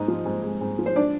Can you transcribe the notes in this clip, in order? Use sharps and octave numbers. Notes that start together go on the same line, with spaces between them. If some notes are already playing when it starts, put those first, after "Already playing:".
Already playing: G#2 D#4 D#5
F3
G#2
G#3
G#2
F3
C5
D4 D5